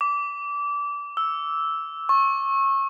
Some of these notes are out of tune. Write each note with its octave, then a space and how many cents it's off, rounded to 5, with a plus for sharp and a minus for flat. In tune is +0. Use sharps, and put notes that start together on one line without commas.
D6 -25
E6 -5
C#6 -25